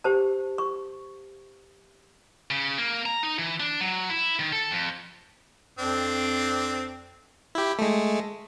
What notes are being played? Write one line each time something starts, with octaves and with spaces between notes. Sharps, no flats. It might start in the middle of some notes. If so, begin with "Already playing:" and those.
G4 C5 A5
C#6
C#3
A#3
A#5
D#4
E3
D4
F#3
E4
D#3
A4
F2
F2 C4 D4
E4 G4
G#3 A3